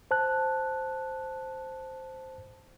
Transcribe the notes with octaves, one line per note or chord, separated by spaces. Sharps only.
C5 A5 F#6